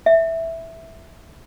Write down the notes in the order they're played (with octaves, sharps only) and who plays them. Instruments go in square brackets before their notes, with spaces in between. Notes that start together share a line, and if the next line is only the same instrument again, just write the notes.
[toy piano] E5